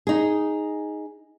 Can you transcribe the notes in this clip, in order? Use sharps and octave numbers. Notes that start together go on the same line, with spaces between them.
D#4 G#4